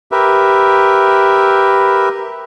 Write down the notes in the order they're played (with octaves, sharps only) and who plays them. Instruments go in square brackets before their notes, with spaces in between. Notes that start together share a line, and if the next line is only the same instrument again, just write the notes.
[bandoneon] G4 A#4 B4 E5